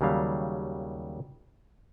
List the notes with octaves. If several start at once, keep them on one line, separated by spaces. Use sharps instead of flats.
D#2 C#3 F#3 G3 F5